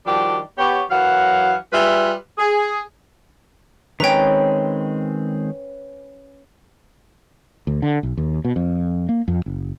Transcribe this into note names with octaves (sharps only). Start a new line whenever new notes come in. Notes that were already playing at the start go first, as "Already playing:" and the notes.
D#3 F3 G3 D4 F#4 G4
B3 G4 C#5
F#2 E3 F#3 F5 F#5
G3 F4 G#4 B4 E5
G#4
D#3 G#3 C4 C#4 B4 G5 A#5
D2
D3
B1
D#2
B2
F2
A#3
F2
F#1